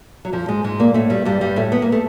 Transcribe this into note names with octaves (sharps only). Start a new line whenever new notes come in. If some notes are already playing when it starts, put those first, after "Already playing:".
F#3
F2 F3
G#2 G#3
G#2 G#3
A#2 A#3
A2 A3
G2 G3
G2 G3
G2 G3
A2 A3
B3
A#3
A3